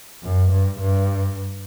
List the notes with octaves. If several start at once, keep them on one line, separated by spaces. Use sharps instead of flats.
F#2
G2
G2